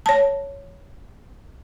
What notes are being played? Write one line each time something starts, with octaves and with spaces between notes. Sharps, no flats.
C#5 A5